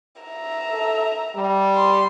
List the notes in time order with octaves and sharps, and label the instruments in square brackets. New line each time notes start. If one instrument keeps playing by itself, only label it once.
[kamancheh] E5 A#5
[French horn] A4
G3
[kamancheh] C6